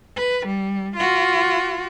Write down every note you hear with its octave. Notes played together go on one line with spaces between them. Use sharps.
B4
G3
F4 F#4